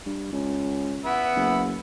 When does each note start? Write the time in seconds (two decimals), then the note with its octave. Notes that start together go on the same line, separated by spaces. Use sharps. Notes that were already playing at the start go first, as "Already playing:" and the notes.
0.06 G2
0.33 C#2
1.05 B3 E5 F#5 B5
1.36 F#1